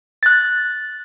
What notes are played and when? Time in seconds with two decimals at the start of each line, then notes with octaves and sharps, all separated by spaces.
0.23 F#6 A6